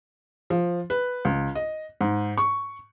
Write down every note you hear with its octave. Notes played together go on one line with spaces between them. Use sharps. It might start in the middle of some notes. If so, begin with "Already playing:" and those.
F3
B4
C#2
D#5
G#2
C#6